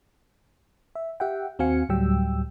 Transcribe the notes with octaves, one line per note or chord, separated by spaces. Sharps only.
E5
G4 E5 F#5 G5
D#2 C4 F#4 F5 G#5 C#7
D2 A2 F#3 G3 G5 E6